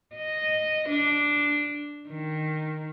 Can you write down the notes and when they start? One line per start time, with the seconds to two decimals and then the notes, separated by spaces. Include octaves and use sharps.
0.16 D#5
0.89 D4
2.09 D#3